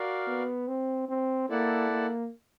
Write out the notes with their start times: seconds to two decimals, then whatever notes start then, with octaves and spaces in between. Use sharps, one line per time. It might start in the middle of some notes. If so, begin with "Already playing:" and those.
Already playing: F#4 A#4 D5 F5
0.27 B3
0.67 C4
1.08 C4
1.49 A#3 E4 A4 D5 F#5 A5
1.90 A#3